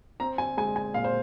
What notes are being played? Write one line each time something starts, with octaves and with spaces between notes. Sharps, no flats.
C4 A#5
G#5
G#3 G#5
G#5
A#2 F5
C5